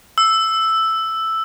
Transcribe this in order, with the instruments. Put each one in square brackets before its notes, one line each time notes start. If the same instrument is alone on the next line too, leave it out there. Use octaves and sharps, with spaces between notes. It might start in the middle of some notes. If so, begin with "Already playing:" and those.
[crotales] E6